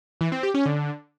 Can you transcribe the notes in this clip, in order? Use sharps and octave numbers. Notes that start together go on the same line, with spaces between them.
E3
C4
G4
C#4
D3